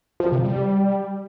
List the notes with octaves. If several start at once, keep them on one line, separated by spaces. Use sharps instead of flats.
F3
C3
G3